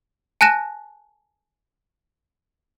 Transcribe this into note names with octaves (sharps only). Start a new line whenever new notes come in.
G#5 A5 F#6 A#6 E7